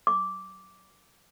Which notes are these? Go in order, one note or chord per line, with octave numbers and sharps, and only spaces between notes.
D6